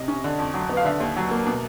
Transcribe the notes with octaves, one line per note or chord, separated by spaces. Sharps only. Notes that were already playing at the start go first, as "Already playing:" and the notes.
Already playing: C3 D#5
C#4
D3
F2
F#3
B3
F5
D3 E5
D#2
F#3
A#3
B2